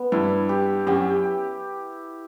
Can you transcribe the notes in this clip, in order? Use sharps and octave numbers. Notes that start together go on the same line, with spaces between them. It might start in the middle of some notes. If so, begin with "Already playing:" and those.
Already playing: B3
G2 E4
G4
F#2 G4